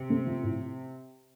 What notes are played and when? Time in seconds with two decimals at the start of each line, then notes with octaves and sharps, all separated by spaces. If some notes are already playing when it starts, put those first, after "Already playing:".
Already playing: C3
0.10 A3
0.27 F3
0.43 A2